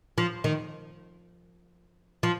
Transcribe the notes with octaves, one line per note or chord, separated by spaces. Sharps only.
F3
D#3
F3